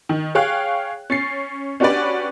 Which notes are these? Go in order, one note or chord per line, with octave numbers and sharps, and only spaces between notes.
D#3
G#4 C#5 F5 G5 F#6
C#4 A6 C7
C#4 D4 F#4 G4 B4 D5